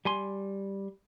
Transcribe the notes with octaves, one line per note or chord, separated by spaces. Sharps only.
G3 G#5 C6